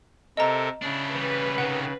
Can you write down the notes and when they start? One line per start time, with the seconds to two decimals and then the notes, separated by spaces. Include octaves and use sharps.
0.37 C3 A4 A#4 D#5 A#5
0.82 C#3 D4 E4
1.15 E3 G3 B4
1.58 C3 D#3 F#5